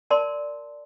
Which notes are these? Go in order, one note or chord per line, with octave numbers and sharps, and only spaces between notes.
A#4 D5 A5 C6